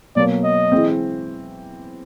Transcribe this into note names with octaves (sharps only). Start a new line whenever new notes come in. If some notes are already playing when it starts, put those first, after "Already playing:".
B2 F#3 A#3 D5
D#5
E3 G#3 C4